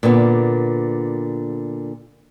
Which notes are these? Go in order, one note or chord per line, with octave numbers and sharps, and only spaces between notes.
A#2 D3 B3